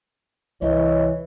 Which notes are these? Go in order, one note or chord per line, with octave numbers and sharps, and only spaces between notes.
C2 E3 C#5 D#5